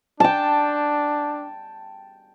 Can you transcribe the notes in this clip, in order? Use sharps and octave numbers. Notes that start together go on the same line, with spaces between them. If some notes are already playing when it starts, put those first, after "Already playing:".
D4 G5 A5